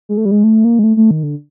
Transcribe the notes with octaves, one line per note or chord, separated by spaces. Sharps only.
G#3
A3
G3
G#3
A3
A#3
G#3
A3
A3
D#3
D3